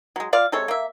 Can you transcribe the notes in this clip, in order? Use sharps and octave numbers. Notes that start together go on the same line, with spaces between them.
F#3 G#3
F4 D5 F5
C3 G#3 A4 C#5
A#3 E5